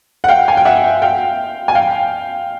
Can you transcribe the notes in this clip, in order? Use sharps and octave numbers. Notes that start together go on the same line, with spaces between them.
F#5
F5 G5
G#5
G5
E5 F#5
F5 G5
G#5
F5 G5